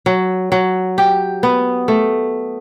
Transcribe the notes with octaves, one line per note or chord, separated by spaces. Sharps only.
F#3
F#3
G4
B3
A3